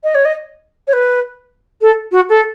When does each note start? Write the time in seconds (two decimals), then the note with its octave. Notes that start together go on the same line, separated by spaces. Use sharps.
0.03 D#5
0.14 C#5
0.25 D#5
0.87 C#5
0.93 B4
1.81 A4
2.11 F#4
2.29 A4